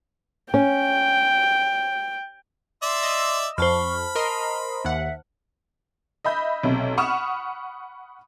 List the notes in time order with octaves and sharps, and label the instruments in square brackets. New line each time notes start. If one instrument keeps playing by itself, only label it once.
[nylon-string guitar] C#4 [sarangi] G5
[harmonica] D5 E5 [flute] C6
[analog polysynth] D#5 E6
[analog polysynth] F2 [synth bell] C5 A5 F6 [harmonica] B5 [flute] C#6
[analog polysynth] A#4 D#5 C6 [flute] A#5
[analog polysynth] D#2 F#5 [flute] E5
[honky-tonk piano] D#5 E5 B5 G6
B1 C3
F#5 B5 C#6 D#6 F6 E7